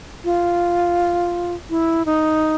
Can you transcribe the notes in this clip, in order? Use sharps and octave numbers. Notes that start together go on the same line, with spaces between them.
F4
E4
D#4